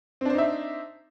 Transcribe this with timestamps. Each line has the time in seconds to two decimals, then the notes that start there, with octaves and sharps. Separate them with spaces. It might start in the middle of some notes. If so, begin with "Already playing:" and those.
0.21 C4
0.25 D4
0.30 C5
0.34 D#4
0.38 E5